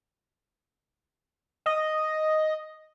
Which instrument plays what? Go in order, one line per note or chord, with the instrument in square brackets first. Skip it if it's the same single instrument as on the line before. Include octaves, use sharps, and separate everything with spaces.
[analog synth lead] D#5